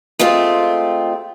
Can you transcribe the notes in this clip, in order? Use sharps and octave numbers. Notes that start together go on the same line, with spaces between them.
G#3 A3 C4 F4